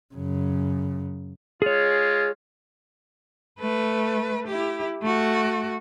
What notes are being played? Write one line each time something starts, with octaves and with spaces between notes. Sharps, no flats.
F#2 C#3
G#3 F4 G#4 C#5
A3 B4
E4 G4
A3 F#4